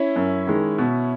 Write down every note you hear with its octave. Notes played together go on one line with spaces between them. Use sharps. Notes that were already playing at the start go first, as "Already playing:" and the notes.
Already playing: C#4 E4
F#2
D#3 G#3
B2